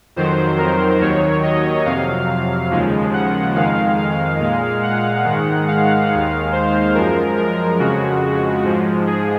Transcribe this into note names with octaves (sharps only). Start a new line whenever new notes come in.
F2 D#3 F#3 C5
A#4
D#2 D#3 F#3 C#5
D#5
F2 C3 F#3 F5
D#2 C#3 F3 G#3
F#5
F2 D#3 G#3 F5
F5
A#2 G#3
F#5
G#2 D#3 G#3
F5
D#2 D#3 G#3
C5
F#2 F3 G#3 A#4
A#4
F2 C#3 G#3 F#4
G#2 F3 G#3
G#4